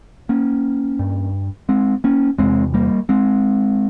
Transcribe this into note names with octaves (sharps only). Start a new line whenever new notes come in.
A#3 C#4
G2
G#3 C4
A#3 C#4
E2 C3 G#3 C4
G3 A#3
G#3 C4